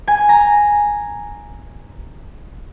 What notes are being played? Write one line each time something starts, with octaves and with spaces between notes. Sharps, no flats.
G#5
A#5